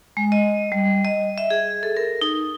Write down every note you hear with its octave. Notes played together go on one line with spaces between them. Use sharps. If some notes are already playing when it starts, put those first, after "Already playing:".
G#3
D#5
G3
D#5
E5
G#4
A4
A#4
D#4